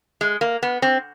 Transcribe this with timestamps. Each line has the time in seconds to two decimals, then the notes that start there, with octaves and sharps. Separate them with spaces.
0.21 G#3
0.41 A#3
0.63 B3
0.82 C4